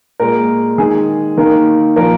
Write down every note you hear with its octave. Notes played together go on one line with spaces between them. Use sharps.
A#2 G#3 A#4
D#3 G#3 G#4
D#3 A#3 A#4
A#2 F3 A#3 A#4